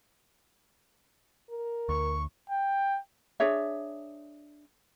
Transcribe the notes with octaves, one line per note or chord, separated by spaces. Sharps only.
A#4
D2 C#6
G5
D4 G#4 C#5 E5